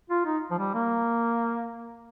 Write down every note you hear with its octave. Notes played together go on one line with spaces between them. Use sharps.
F4
D#4
F3
G3
A#3